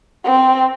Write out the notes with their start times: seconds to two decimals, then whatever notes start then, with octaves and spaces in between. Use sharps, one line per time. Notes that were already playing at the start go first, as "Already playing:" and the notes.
0.24 C4